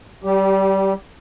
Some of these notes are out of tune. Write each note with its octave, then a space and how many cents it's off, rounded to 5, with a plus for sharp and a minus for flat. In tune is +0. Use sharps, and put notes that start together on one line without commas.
G3 -25 G4 +0